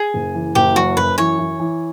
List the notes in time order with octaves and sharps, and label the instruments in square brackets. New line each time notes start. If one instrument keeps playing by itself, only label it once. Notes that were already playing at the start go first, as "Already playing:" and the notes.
Already playing: [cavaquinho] G#4
[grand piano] F#1
E3
[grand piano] F#1 [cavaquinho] G4
[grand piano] F#2 [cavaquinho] F#4
[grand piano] F#2 [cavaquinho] B4
[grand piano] E3 [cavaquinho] C#5
[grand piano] E3
E3